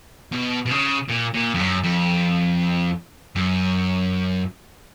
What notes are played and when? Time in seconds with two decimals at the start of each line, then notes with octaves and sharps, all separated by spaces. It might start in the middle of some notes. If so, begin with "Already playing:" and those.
0.32 B2
0.66 B2
0.71 C#3
1.08 A#2
1.34 A#2
1.54 F2
1.60 F#2
1.84 F2
3.36 F#2